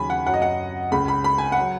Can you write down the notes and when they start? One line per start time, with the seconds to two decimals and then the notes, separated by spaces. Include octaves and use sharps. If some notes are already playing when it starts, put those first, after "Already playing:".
Already playing: D#2 C#3 F#3 G#5 B5
0.10 F#5
0.26 F#2 F#3 F#5
0.34 D#5
0.42 F#5
0.92 C#2 C#3 G#3 B5
1.08 B5
1.24 B5
1.38 G#5
1.52 F#5
1.59 F#3